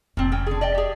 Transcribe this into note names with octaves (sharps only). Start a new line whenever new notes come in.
F1 A#2 C4
C#3 G5
D3 G#4
D5 D#5 G5
G4 G#4